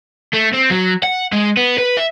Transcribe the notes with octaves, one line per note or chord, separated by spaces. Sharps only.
A3
C4
F#3
F#5
G#3
B3
B4
E5